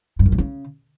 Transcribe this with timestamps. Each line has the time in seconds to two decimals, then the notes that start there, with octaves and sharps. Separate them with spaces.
0.19 G2
0.26 F#2
0.32 A#2
0.38 C#3